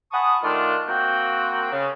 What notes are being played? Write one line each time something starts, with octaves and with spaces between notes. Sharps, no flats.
F#5 G#5 A5 B5 C#6 D#6
D#3 A3 D4 F4
A#3 C4 F#4 G5
C#3